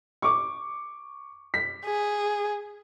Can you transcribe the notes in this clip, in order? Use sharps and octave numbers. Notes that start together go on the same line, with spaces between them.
C#6 D6
B6
G#4